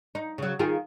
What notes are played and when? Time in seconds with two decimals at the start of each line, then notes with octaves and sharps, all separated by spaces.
0.15 D#4
0.38 C#3 F#3
0.59 D#3 F4 G#4